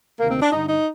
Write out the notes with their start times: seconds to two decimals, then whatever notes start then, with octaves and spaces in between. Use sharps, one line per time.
0.19 D2 C3 D#3 A#3
0.30 C4
0.41 D4
0.52 G2 D3 D#4
0.69 D#4